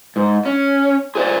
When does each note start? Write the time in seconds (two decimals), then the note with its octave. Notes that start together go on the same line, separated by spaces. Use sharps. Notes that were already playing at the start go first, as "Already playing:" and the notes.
0.16 G#2
0.46 C#4
1.15 G#4 C5 D5